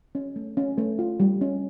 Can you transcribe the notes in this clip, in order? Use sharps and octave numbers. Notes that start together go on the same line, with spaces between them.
C#4
A3
C#4
A3
F4
G3
C#4